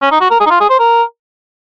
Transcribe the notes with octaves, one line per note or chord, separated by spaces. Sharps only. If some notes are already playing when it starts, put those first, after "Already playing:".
C#4
D#4
F#4
A#4
G#4
D#4
F4
G#4
C5
A#4